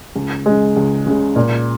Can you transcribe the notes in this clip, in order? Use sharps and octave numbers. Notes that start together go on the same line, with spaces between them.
C#2
C#3 G#3
C#2
C#3 G#3
A#2